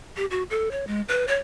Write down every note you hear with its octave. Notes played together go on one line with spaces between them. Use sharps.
G4
F#4
A4
C#5
G#3
B4
C#5